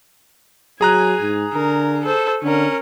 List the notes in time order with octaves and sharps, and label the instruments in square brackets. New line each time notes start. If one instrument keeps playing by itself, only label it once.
[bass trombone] F#3 [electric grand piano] G#4 A#5 F#6 [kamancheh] G#5
[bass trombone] G#2
[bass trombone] D3 [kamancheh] A#4
[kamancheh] A4 C5
[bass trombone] D3 [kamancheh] C#4 A#4